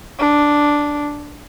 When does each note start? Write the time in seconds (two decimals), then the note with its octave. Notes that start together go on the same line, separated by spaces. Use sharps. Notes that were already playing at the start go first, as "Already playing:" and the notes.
0.20 D4